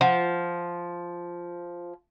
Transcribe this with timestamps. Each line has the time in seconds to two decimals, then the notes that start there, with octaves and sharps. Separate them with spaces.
0.01 F3 F#5